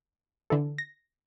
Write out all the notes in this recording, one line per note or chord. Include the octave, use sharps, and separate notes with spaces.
D3 E3 A4
A#6